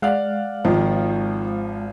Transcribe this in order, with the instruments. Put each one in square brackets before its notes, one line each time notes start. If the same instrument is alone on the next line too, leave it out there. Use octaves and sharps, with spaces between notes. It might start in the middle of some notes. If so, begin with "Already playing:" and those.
[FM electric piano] G#3 F5 F6 [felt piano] D5 F#5
[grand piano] G#1 [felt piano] D#3 [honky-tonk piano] F3